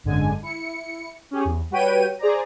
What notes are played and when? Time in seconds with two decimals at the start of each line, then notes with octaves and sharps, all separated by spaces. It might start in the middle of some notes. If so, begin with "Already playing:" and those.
0.04 G#1 F#2 D3 G#3 G#5
0.42 E4 C#7
1.31 C#4 G4 G#4
1.45 E2
1.71 G3 F#4 B4 C#5 G5 D#7
2.19 G#4 C5 D5 A#5